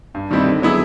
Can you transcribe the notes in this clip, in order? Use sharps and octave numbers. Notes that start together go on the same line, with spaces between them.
G2
D#3 G3 C4 E4
D3
F#3 B3 E4 G#4